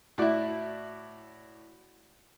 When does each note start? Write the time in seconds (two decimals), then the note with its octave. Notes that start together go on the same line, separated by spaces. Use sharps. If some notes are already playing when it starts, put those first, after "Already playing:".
0.18 A2 E4 F#4 D5 A5